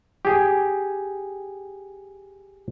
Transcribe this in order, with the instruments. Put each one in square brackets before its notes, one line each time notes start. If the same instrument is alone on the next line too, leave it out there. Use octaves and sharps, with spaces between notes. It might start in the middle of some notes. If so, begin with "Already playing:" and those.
[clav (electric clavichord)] G4 G#4 G5